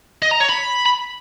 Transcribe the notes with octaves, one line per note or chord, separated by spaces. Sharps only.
D#5
A#5
C#5
B5